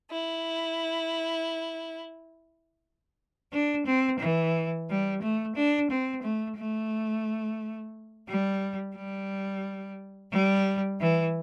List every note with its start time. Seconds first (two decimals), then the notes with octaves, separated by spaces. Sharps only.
0.12 E4
3.52 D4
3.85 C4
4.20 E3
4.88 G3
5.21 A3
5.55 D4
5.90 C4
6.23 A3
6.57 A3
8.27 G3
8.95 G3
10.31 G3
10.99 E3